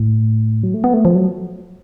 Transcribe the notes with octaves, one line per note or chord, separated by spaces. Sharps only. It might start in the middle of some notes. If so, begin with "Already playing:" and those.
Already playing: A2
F#3
A3
B3
A3
F3
F#3